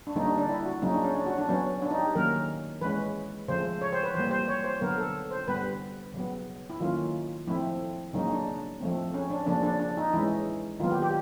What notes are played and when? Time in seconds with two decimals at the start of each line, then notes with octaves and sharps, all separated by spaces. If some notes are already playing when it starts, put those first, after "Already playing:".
0.07 D4
0.15 D3 G3 A#3 C#4 D#4
0.26 D4
0.38 D4
0.49 E4
0.65 F#4
0.82 C#3 F#3 A#3 C#4 D#4
0.94 D4
1.04 C#4
1.16 D4
1.26 F#4
1.38 D4
1.49 F#3 B3 C#4
1.82 D4
1.91 D#4
1.99 G4
2.15 D#3 F#3 A#3 C#4 A#4
2.81 E3 G#3 C#4 B4
3.48 C#3 F3 A3 C5
3.82 C#5
3.92 C5
4.04 B4
4.14 E3 G3 A#3 C5
4.31 C5
4.48 C#5
4.64 C5
4.81 D3 F#3 B3 A#4
4.98 A4
5.31 C5
5.48 D3 G3 B3 B4
6.14 C#3 F#3 B3
6.70 E4
6.80 D#3 F#3 A#3 C#4 F4
7.47 F3 A3 C4 E4
8.13 C#3 F#3 A#3 C#4 D#4
8.31 D4
8.80 F3 A3 C4
9.14 C#4
9.30 D4
9.46 C#3 F3 A#3 C#4 D4
9.63 D4
9.80 D4
9.97 D#4
10.13 E3 G#3 C#4 E4
10.80 D#3 F#3 B3 F4
10.91 G4
11.02 G4